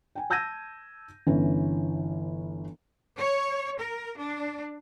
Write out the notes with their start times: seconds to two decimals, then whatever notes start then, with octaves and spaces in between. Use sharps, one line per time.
0.15 G5 G#5
0.30 A5 E6 G6 G#6 A#6 D#7
1.27 G1 E3 C#4
3.18 C#5
3.80 A#4
4.18 D4